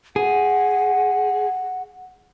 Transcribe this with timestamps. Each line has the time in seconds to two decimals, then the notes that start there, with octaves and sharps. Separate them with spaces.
0.16 G#4 F#5